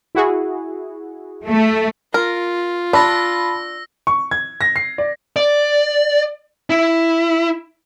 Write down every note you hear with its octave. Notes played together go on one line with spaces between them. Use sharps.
E4 F#4 G#4
A3
F4 A#4
D4 A5 B5 E6 A#6
C#6
G#6
A#6
C7
D5
D5
E4